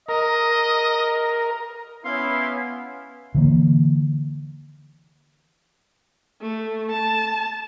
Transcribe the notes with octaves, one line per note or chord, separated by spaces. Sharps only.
A#4 D#5
B3 C#4 E4 F5 C6
D3 E3 A#3
A3
A5